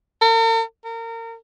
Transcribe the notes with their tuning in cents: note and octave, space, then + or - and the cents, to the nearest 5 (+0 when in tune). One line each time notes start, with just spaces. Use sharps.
A#4 -45
A#4 -30